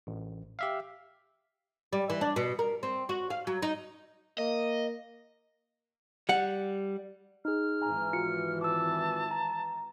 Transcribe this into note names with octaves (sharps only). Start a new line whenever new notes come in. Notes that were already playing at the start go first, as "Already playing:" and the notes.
A1
G4 E5 F5
G3
E3
D4
B2
A#4
C4
F#4
F5
F#3
D#4
A#3 D#5
G3 F#5
D#4 G#4 F6
G#1 E3 G#5 A#5
F4 F#4 C#7
A5 D6 E6
A#5